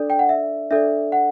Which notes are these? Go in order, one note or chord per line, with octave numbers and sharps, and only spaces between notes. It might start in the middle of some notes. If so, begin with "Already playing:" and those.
Already playing: D4 A4 D5
G5
F#5
E5
D4 A4 D5 E5
F#5